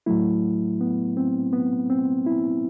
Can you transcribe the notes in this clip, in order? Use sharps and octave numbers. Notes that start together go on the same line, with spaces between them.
A2 F#3 A3 E4
B3
C4
B3
C4
E4